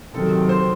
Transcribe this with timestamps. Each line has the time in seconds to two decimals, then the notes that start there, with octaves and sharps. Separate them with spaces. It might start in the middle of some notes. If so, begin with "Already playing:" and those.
0.14 C3 D#3 F#3 C4 A4
0.49 C5